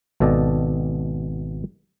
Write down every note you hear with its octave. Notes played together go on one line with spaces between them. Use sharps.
G#1 B2 A4 D5 D#5 A5